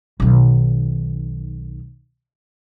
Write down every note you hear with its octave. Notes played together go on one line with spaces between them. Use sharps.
B1 D#3